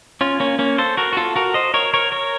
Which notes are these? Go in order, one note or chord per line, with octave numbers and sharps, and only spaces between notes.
C#4 F4
A#3 C#4
A#3 C#4
A4 C5
F#4 A#4
F#4
F4 A4
F#4 A#4
C5 D#5
A#4 C#5
A#4 C#5
A#4 C#5